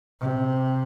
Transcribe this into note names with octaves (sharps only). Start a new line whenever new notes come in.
C3